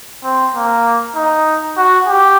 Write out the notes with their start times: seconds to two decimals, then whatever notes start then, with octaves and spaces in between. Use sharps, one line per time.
0.24 C4
0.55 A#3
1.16 D#4
1.77 F#4
2.07 G4